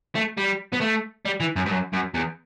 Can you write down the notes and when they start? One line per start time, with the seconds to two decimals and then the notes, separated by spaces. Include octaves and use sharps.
0.15 A3
0.38 G3
0.74 B3
0.81 A3
1.26 G3
1.40 E3
1.56 F#2
1.66 G2
1.71 F#2
1.93 F#2
2.14 E2